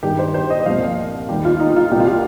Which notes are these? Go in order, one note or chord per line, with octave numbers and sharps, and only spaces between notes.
G2 D#3 G3 G4
C5
C5
D#5
C2 A#2 F3 F5
D#2 D#3 G3 G4
F4
D#4
F4
C2 A#2 G3 G4
F4
G4